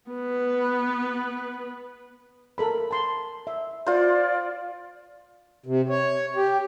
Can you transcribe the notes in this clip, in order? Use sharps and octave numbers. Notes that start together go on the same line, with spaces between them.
B3 B4
A4 A#4 B5
A5 C6
E5
F4 C5 D5
C3
C#5
G4